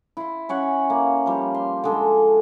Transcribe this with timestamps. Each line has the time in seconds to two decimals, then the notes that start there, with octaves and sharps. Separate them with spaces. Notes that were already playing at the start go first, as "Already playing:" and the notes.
0.17 E4 C6
0.49 C#4 C#5 F#5
0.90 A#3
1.26 F3 G3
1.54 C6
1.84 D3 G#3 A4